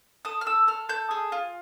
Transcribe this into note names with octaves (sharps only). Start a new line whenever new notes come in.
A4 D#6
F6
A4 E6
A4 F6
A4 G6
G#4
F4